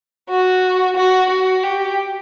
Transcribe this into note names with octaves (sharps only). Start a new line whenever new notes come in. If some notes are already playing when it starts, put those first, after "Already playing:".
F#4
F#4
F#4
G4